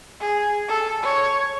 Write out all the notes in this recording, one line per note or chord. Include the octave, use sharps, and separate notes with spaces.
G#4
A4
C#5